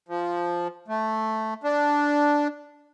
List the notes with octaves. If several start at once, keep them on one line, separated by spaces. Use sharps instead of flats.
F3
A3
D4